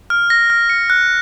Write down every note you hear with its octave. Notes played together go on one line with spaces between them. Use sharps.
F6
A#6
F6
C#7
F#6